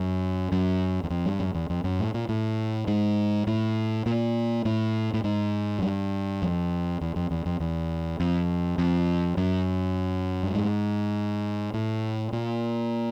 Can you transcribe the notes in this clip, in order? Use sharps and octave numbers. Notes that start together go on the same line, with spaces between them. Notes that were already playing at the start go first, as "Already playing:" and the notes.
Already playing: F#2
F#2
E2
F2
G2
F#2
E2
F2
F#2
A2
A#2
A2
G#2
A2
A#2
A2
A2
G#2
F#2
G2
F2
E2
F2
E2
F2
E2
F2
F2
F#2
G2
G#2
A2
A#2